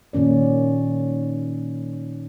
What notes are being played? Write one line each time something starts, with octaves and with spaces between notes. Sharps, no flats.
A#2 D#3 C#4 D5